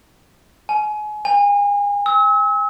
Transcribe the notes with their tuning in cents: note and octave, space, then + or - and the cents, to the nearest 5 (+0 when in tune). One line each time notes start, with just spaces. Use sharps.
G#5 +30
G#5 -35
E6 -40